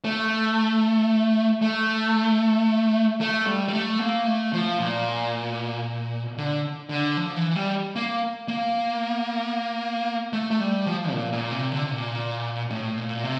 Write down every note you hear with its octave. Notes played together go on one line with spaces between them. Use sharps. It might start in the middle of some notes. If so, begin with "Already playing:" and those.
A3
A3
A3
G3
G3
A3
A#3
A3
F3
A#2
D3
D3
F3
E3
G3
A#3
A#3
A3
A3
G3
F3
A#2
A#2
C3
D3
C3
A#2
A2
A#2
C3